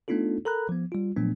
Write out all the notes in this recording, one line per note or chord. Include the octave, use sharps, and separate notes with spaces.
A3 B3 D4 D#4 F4 A4
A4 A#4 A#5 B5 F#6
F3 B3
G3 F4
A#2 F3 F#3 A3 B3 D4